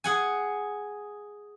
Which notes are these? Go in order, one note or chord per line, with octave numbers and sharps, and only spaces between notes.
G#4 F#5 G#5